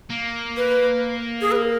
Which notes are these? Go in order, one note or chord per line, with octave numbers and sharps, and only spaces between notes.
A#3
B4
G#4
B4
A#4